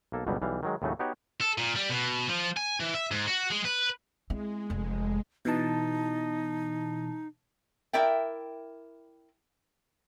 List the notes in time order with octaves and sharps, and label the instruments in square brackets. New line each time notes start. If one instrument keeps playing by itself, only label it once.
[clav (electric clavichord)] B1 A#3 A4
G1 C#2 B2 F#3 G3
B1 E3 G3 F5
D#3 F#3 G#3
D#2 A2 C#3 F#3 A3 D#4
B3 D#4 F#4 G4 C#5 F#5
[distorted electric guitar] A4
A#2
G3
B2
F3
G#5
E3
E5
G#2
F#4
G#3
B4
[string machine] G#3 [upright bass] C4 E4
[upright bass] F1 F2
[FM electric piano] B2 E3 A5 [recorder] D#4
[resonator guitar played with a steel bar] E4 A#4 D5 E5 G5